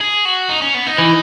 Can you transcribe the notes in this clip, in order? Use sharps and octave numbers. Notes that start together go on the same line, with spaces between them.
G#4
F#4
D#4
C#4
B3
D#4
E3